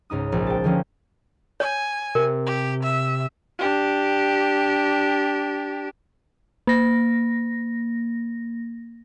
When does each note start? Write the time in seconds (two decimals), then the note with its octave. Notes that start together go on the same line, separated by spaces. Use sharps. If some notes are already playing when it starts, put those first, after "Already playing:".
0.10 C#2 G#2 D#4 D#6
0.32 A#1
0.47 G5 A5
0.64 D3 F3 A#3 C#4
1.60 C#5 G#5
2.15 C3 A#4
2.47 G4
2.83 E5
3.59 D4 G4
6.67 A#3 A#6